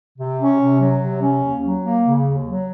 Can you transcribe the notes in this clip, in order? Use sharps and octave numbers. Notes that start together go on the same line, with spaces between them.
C3
C#4
C3
F#3
C3
C#4
D#2
F#3
A#3
C#3
D#2
F#3